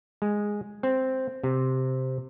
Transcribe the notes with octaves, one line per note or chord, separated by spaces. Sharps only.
G#3
C4
C3